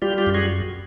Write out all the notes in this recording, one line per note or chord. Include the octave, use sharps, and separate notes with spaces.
G3 F4 G4
F4 G4
F#2
F#4 G#4